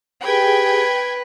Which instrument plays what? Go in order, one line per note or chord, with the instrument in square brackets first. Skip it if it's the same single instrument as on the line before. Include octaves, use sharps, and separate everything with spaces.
[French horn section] G4 G#4 [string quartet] B4 [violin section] G5 G#6